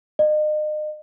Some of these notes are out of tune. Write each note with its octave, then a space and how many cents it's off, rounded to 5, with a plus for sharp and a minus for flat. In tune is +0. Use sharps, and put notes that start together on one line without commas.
D#5 -35